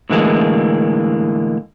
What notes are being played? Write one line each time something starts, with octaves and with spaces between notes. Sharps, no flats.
A2 D3 E3 G#3 A#3